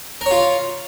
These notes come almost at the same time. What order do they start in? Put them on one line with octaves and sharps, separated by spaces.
A#4 C#5 F4